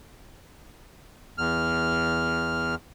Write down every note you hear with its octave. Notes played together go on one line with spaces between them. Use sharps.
E2 F6